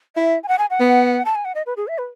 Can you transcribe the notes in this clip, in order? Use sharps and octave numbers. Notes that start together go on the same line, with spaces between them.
E4 E5
G#5
F#5
G#5
F#5
B3
A5
G#5
F#5
D#5
B4
G#4
E5
B4